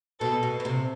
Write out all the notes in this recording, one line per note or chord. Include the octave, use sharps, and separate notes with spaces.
B2 A4
B2
B2
C3